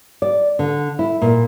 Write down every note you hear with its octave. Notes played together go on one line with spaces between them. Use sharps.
D5
D3
E4
A#2